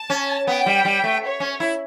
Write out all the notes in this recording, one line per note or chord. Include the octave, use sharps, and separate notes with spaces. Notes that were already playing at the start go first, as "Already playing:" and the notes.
Already playing: A5
C#4
B3 G5
G3
G3
A3
C#5
C#4
E4